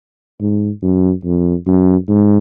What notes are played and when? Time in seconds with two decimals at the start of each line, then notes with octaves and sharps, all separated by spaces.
0.41 G#2
0.82 F#2
1.24 F2
1.66 F#2
2.09 G#2